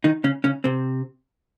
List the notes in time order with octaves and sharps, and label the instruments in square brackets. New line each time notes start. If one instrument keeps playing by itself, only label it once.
[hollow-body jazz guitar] D#3 D#4
C#3 C#4
C#3 C#4
C3 C4